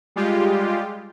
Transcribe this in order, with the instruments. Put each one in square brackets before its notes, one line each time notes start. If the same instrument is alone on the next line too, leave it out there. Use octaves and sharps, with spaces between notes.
[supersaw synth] G3 G#3 F4 G4